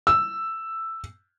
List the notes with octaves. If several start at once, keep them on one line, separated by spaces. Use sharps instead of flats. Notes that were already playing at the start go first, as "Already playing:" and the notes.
E6